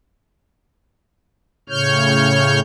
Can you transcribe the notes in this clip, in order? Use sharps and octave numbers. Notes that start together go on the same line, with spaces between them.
A2 C#3 C#5 F6 G6